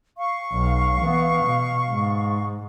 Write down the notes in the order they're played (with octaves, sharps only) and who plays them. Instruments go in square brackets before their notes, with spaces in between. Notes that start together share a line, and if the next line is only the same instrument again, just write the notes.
[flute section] F5 C#6
[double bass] B1
E3 B3
B2
G#2